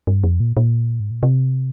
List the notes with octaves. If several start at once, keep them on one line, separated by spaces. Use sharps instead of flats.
G2
F2
A#2
A#2
G#2
A#2
C3